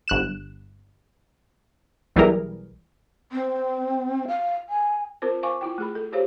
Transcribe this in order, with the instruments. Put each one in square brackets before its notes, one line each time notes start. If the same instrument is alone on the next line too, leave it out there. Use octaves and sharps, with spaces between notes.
[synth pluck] G1 F#6 E7
B1 E3 G3 E4 G#4 A#4
[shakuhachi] C4
F5
G#5
[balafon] C4 F4 A#4 C5
C5 F5 G#5 C#6 D6
E4 F4 G5
A3 G#4 B5
A4
F4 G4 G#4 C5 C#5 F5